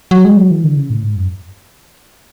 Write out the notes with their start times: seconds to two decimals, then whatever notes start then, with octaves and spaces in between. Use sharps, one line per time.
0.11 F#3
0.25 G#3
0.37 F#3
0.51 E3
0.64 D3
0.77 C#3
0.90 A2
1.03 G#2
1.16 F#2